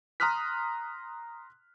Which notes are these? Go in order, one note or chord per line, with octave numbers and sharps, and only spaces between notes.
A#5 C6 D#6 F6 F#6 B6